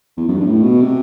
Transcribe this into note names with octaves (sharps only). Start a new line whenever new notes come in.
E2
F#2
G2
A2
B2
C3